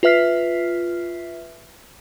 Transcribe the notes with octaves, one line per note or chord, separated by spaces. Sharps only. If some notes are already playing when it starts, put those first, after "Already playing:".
F4 B4 E5 F6 B6 C7